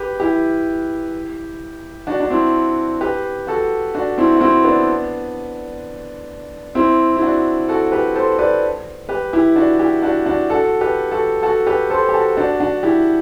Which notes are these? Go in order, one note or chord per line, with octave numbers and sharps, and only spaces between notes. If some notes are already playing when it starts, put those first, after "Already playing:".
Already playing: G4 B4
E4 G4
D4 F#4
D4
C4 E4
G4 B4
F#4 A4
D4 F#4
C4 E4
F#4
C4 E4
B3 D4
C4 E4
E4
D4 F#4
F#4 A4
G4 B4
A4 C5
B4 D5
G4 B4
E4 G4
D4 F#4
E4 G4
D4 F#4
D4 F#4
F#4 A4
G4 B4
F#4 A4
F#4 A4
G4 B4
A4 C5
G4
F#4 A4
D4 F#4
D4 F#4
E4 G4